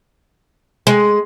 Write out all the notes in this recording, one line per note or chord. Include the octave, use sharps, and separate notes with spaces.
G#3